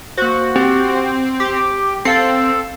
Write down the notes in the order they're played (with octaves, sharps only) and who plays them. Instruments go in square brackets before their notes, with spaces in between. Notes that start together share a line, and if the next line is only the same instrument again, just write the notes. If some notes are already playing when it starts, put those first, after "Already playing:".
[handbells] A#3 C5 [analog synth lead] F#4
[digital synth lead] C4 [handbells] G4
[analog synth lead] G4 [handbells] D6
[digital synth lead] C4 [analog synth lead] A4 [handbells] F5 C7